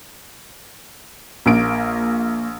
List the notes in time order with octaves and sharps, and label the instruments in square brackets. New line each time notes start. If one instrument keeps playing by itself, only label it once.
[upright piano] A#1 D7 [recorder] A#3